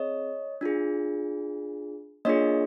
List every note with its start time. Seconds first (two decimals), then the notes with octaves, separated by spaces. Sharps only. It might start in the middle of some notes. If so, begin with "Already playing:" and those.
Already playing: C4 G#4 C#5 D#5
0.61 D4 F4 G#4
2.25 A#3 D4 F4 G#4 C#5 D#5